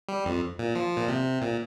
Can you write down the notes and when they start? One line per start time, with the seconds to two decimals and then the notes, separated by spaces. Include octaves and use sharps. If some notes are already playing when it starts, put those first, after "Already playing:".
0.08 G3
0.25 F2
0.59 A#2
0.75 F3
0.97 A#2
1.09 C3
1.42 A#2